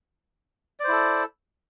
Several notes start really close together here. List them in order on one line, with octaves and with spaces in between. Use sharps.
D5 C5 E4 A4